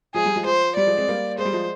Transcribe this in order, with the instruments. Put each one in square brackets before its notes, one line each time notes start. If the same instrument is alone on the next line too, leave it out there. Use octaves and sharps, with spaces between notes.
[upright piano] F3 G#3 [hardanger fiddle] G#4
[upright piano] G3
F3 G#3
[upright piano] F3 [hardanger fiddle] C5
[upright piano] G3 [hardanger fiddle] D5
[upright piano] F3 G#3
G#3 C4
G3 A#3
[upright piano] G#3 [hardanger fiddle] C5
[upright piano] G3
F3 G#3